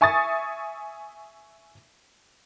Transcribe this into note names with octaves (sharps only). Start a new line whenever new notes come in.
E5 G#5 C#6 D#6 A6